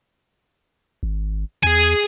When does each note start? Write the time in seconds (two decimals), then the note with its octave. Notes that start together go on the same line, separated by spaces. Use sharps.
1.03 G#1
1.63 E2 G#4 G#5